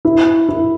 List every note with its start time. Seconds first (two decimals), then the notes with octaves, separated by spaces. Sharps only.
0.05 E4
0.49 E4